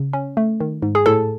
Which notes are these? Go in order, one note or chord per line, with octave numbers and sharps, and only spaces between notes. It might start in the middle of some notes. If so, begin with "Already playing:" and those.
Already playing: C#3
C#4
A3
D#3
G#2
G#4
A2 A4